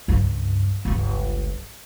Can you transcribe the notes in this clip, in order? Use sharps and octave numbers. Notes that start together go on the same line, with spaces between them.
C#2 G2
G1 C#2